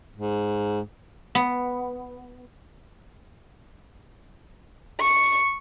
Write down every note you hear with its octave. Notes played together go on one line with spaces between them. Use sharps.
G#2
B3
C#6